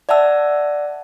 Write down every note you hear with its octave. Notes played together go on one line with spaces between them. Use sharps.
D5 E5 F#5 A5 E6